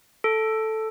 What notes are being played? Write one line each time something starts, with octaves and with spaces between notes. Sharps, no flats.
A4